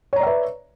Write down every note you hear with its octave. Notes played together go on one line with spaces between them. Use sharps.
B4 C#5 D5 E5 A#5